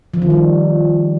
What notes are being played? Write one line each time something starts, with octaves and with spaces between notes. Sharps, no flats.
F3
D#3
G3